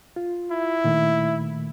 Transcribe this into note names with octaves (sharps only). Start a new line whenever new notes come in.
F4
E4
A#2 D#3 A3